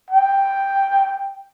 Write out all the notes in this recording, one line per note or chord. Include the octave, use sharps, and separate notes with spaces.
G5